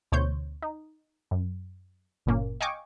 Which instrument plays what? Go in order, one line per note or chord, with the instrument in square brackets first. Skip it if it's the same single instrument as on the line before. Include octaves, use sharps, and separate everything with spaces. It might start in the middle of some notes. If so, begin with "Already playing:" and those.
[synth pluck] D2 B2 C5 C#5 G6
D#4
F#2
G1 A#2 A#3 C#4
D#5 F5 G5 G#5 C#6 D6